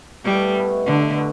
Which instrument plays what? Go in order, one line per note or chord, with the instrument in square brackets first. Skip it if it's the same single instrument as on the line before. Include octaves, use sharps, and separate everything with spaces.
[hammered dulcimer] B2 A3 E4 [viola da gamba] G3
[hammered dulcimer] B2 A3 E4
[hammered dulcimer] B2 A3 E4 [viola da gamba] D3
[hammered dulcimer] B2